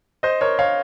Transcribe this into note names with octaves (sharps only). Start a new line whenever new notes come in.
C5 D#5
A#4 C#5
C#5 F5